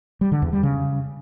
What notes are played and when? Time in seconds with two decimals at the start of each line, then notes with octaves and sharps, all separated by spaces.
0.21 G3
0.32 D3
0.42 E2
0.53 G3
0.63 C#3